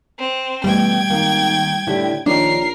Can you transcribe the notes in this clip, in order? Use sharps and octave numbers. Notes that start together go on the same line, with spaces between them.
C4
B2 E3 G3 A3 G5 G#6
G#1 D#3 A#3
A2 D3 E4 G4
A#1 D#3 D4 D#4 A#4 C#5 C7